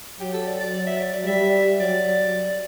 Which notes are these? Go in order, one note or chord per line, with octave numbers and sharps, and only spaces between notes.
F#3 G4
A4
D5
D5
F#3 D5
E5
D5
D5
G3 E5
F#3 D5